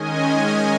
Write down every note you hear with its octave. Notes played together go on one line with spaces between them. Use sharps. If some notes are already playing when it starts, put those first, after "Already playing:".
Already playing: D#3 G#3 C#4 D#5 G#5